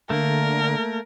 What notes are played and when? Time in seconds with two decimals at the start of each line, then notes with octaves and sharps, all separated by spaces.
0.10 D3 A3 A#3 A#4